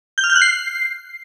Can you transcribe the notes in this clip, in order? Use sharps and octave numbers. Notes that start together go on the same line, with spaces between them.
G6
F6
G6
F#6
C7